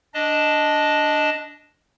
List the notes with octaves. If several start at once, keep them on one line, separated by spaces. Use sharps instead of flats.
D4 D#5 A5